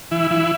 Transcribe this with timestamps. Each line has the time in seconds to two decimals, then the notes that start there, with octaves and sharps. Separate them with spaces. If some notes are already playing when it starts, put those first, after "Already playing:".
0.11 E3 E4
0.31 E3 E4